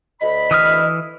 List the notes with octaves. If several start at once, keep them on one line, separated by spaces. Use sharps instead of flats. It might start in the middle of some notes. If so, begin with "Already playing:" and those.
D2 D#5 B5
E3 D#6 F6